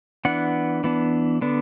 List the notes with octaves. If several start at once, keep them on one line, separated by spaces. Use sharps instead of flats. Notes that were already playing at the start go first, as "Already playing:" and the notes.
E3 B3 D4 F#5
E3 B3 D4
D3 B3 D4